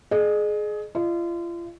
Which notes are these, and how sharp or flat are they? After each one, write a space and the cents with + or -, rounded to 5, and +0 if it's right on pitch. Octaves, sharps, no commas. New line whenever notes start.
G#4 +25 D#5 -40
F4 -35 D#5 -35